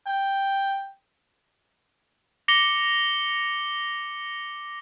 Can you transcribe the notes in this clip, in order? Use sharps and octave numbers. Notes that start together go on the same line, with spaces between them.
G5
D6 A#6 C#7 F7 G7